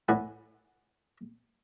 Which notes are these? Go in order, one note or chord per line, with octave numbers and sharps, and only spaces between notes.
A2 B4 F#5 G#5